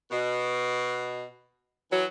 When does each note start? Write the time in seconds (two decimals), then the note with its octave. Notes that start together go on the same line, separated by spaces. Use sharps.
0.10 B2
1.91 E3 F#3